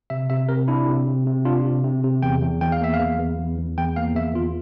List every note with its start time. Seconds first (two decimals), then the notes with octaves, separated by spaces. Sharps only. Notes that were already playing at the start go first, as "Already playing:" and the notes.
0.10 C3 E5
0.30 C3 E5
0.49 C3 A#4
0.68 D4 E4
0.88 C3
1.07 C3
1.27 C3
1.45 D4 F4
1.65 C3
1.84 C3
2.04 C3
2.22 E2 G5
2.41 E2
2.61 E2 G5
2.72 F5
2.81 A#3 E5
2.94 F5
2.99 E2
3.19 E2
3.38 E2
3.58 E2
3.77 E2 G5
3.96 A#3 F5
4.15 E2 E5
4.35 E2 F4